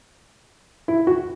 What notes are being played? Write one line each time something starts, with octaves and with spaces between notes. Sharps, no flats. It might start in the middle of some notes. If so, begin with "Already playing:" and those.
E4
F#4